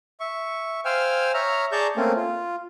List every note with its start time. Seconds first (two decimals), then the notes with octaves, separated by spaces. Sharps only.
0.20 E5 C#6
0.85 C5 F5 G5 G#5 E6 F6
1.34 C#5 E5 A#5 F6
1.72 G#4 D5 A5 A#5 C#6 G6
1.97 A3 A#3 C4 C#4
2.16 F4